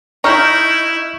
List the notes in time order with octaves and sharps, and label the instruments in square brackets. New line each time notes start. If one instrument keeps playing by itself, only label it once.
[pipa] D#4 [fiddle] E4 [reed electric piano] C#6 F6 G6